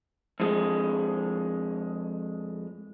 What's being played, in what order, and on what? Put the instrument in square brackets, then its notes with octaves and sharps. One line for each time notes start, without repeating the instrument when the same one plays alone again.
[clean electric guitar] F2 G#3